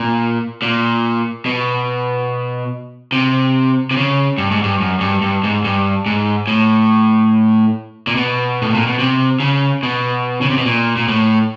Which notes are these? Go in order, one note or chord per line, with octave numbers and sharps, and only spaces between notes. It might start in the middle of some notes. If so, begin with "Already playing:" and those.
Already playing: A#2
A#2
B2
C3
C3
C#3
G2
G#2
G2
F#2
G2
G2
G#2
G2
G#2
A2
A#2
B2
A2
A#2
B2
C3
C#3
B2
C#3
C3
B2
A#2
A#2
A2